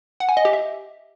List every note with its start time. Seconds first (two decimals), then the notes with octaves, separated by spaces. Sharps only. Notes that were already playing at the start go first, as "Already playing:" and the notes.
0.20 F#5
0.29 G#5
0.37 D#5
0.45 G4
0.53 E5